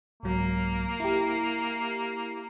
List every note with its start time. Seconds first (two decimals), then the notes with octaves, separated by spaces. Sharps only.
0.23 C2 G#2 F#3 A#3
1.00 E4 G4